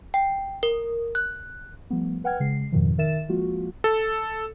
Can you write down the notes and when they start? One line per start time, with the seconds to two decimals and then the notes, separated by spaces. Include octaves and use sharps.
0.14 G5
0.63 A#4
1.15 F#6
1.90 F3 G3 A3 B3
2.24 B4 F#5 G5 F6 G#6
2.40 C#3 G#3 C7
2.72 F2 G#2 B2 D#3 F3
2.98 D#3 A#4 E5 A6 E7
3.29 F3 G#3 A#3 F4 F#4
3.84 A4